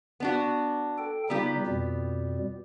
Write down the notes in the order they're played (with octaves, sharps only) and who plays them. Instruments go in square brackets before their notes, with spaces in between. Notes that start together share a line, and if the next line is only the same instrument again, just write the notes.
[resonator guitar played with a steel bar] B3 D4 F#4
[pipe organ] A4 G5
[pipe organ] C#3 G3 D#4 [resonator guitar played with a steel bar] B3 F4 G4
[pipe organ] F2 B2 G3